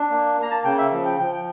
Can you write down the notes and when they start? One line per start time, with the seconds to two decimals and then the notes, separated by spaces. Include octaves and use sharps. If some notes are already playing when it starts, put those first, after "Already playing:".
Already playing: D4
0.10 A#3
0.38 A#3 A#5
0.51 A5
0.64 C#3 G5
0.78 E5
0.91 F3
1.05 G5
1.18 F3 G5
1.31 G5